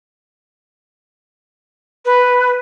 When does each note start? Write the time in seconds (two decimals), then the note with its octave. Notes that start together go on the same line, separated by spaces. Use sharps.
2.05 B4